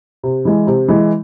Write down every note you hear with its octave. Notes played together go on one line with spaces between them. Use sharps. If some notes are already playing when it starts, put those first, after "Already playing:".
C3
E3 G#3
C3
E3 G#3